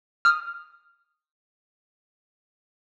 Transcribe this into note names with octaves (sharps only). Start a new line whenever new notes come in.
D#6 F6